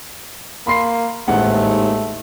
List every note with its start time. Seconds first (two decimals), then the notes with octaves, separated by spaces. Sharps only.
0.67 A#3 B5 C6 C7
1.28 A1 D#2 G#2 A3 F#5